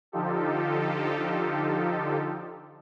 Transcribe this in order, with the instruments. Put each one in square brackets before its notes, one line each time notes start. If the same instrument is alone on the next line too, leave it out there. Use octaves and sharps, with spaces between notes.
[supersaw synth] D3 F3 D#4 F4 G4 A4